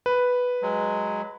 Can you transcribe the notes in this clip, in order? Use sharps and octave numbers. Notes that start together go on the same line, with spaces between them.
B4
F#3 G#3